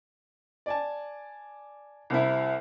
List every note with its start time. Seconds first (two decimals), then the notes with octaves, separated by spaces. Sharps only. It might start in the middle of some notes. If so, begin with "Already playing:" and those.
0.66 D5 G#5 A5
2.10 C2 C3 E4